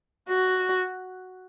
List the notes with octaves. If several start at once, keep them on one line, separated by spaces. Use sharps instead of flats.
F#4